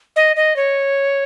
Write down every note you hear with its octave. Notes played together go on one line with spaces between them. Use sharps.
D#5
D#5
C#5